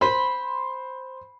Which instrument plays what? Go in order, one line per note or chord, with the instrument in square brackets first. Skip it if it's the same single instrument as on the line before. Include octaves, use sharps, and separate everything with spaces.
[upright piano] C5 C6 [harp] B5